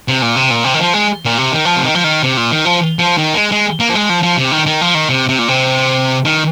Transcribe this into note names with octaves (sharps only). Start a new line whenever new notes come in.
C3
A#2
C3
A#2
C3
D#3
F3
G#3
A#2
C3
D#3
F3
C3
D#3
F3
D#3
C3
A#2
D#3
F3
F3
D#3
A#3
G#3
G#3
A#3
F3
G#3
F3
F3
C3
D#3
D#3
F3
D#3
C3
C3
A#2
C3
D#3